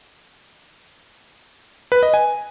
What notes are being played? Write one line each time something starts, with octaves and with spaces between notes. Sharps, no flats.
B4
D#5
G#5